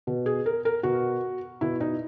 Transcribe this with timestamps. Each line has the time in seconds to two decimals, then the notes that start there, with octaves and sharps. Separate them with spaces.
0.07 B2
0.26 G#4
0.46 A#4
0.65 A#4
0.83 B2 F#4
1.61 B2 E4
1.81 D#4